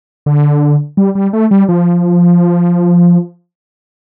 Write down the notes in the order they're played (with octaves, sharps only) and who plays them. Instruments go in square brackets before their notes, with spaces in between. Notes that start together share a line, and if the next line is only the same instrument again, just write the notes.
[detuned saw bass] D3
G3
G3
A3
G3
F3